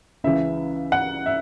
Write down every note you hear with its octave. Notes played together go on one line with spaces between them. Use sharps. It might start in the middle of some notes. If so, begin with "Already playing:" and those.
C#2 C#3 E3 E5
F#5
E5